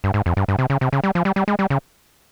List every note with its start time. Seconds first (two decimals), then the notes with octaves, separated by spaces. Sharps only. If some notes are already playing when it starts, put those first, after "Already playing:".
0.04 G2
0.14 G#2
0.26 F2
0.37 G2
0.48 G2
0.59 C3
0.70 C#3
0.81 C3
0.93 C#3
1.04 G3
1.15 F3
1.25 G3
1.36 G3
1.48 G#3
1.59 G3
1.70 C#3